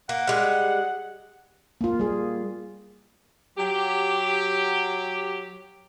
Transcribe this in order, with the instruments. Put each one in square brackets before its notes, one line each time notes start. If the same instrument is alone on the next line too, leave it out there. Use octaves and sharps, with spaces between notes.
[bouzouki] A#3 [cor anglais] F#5
[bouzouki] G3 G#3
[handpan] A#3 F4
G3 G#4
[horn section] F#3 G4